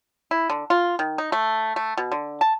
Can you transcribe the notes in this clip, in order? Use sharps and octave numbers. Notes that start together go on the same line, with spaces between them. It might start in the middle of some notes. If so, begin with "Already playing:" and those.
E4
D3
F4
D#3
D#4
A3
A3
B2
D3
A5